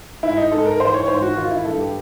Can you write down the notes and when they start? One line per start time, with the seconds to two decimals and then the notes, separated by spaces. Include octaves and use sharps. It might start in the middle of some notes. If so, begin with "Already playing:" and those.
0.23 G#2 E4
0.37 D#4
0.51 G#2 A4
0.65 A#4
0.80 E3 C5
0.94 C#5
1.08 G#2 C5
1.22 F#4
1.37 D#3 F4
1.51 E4
1.65 G2 A4
1.80 G4